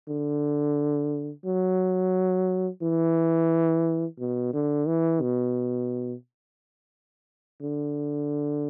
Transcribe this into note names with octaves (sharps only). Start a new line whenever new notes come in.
D3
F#3
E3
B2
D3
E3
B2
D3